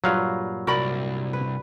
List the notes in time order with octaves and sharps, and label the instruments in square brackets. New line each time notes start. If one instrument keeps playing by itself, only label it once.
[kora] G2 A#2 B4 [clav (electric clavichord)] F#3 F5
[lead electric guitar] C2 [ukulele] F#4 D5 B5 [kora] A#4
[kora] B4